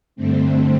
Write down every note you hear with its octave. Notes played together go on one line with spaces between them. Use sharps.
G2 D3 A3 C4